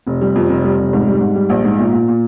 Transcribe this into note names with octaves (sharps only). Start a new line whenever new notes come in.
F1
G3
F2
F1
G3
F1
G#2
G3
G#2
G3
A#1
G#2
A#2
A#2
A#2